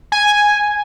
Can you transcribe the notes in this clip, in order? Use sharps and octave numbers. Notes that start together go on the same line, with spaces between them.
G#5